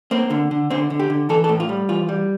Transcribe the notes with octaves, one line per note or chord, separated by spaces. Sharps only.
A#3 C4
D3
D3
D3 C4
D3
G4
D3
E3 A4
A4
A2
F4
G3
E3 F4
G3